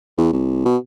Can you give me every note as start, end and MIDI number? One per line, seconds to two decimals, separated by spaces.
0.18 0.29 40
0.32 0.64 36
0.65 0.77 47